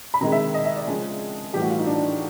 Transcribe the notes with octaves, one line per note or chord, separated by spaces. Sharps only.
B5
C3 D#3 G#3 A#5
E5
D#5
E5
D5
C#3 F3 G#3 G#4
A2 E3 G3 G4
F#4
F4
D#4
D4